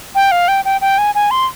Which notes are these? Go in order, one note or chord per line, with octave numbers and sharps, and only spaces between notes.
G5
F5
G5
G5
G5
G#5
G#5
C6